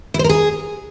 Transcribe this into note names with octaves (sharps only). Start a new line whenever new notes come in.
E4
C5
A#4
G#4